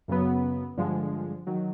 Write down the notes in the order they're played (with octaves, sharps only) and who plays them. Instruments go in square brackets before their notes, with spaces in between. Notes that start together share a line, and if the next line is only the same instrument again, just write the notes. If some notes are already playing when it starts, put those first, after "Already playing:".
[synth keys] F#2 C#3 F#3 B3
G2 D3 F3 G#3
D#3 F#3